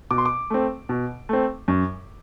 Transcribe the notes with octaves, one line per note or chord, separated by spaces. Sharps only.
B2 D6
C6
D6
A3 C4
B2
A3 C4
F#2